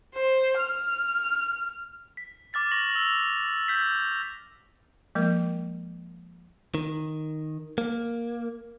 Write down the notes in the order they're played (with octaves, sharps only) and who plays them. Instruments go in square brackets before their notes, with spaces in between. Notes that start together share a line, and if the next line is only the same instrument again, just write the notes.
[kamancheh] C5
F6
[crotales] B6
D6 F6 A6 B6
C#6 A#6 F#7
E6 F7 F#7
G6 B6
[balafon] F3 G#3 A#3 A#4
[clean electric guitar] D#3
A#3